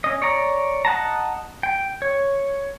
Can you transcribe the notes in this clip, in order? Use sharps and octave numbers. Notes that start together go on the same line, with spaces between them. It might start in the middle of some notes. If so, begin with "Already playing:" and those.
C#4 D#5
C#5 D5 A#5
D#5 F#5 A5 A#5
G5
C#5